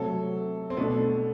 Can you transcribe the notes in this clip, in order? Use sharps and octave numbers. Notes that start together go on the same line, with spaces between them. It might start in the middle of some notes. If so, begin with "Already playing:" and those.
Already playing: C3 F#3 A3 A4
C4
B2 A3 B3 D4 A4